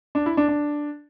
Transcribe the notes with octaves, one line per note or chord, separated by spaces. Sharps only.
D4
E4
D4
D4